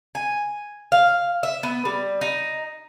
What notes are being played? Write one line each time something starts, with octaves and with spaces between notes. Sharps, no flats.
G#5
F5
E5
B3
G3
D#4